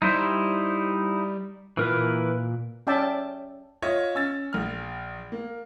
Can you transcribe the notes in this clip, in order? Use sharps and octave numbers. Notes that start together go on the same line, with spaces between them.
G3 D#4 E4 C5
A#2 E3 A#4 B4
C#4 D5 E5 G5 A5
F4 C#5 D#5 E5
C#4 E6 A6
A#1 F6
A#3